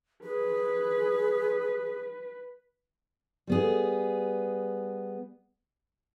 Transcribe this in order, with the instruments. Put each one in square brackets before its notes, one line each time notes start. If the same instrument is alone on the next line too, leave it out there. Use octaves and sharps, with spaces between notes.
[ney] G#4 [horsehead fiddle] B4
[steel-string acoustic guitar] G3 B3 G#4